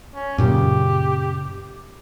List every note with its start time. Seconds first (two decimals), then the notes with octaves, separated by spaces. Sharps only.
0.15 C#4
0.38 F#2 A#2 C#3 G4